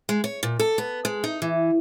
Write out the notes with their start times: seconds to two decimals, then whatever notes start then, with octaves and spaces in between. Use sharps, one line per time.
0.09 G#3
0.24 C#5
0.43 A#2
0.59 A4
0.78 B3
1.05 G#3
1.24 D#4
1.42 E3